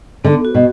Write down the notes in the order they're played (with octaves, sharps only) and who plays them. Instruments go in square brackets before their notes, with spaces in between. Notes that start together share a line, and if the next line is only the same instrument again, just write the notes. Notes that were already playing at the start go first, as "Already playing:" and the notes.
[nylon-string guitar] D3 [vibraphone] B3
[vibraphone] F#4
[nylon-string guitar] B2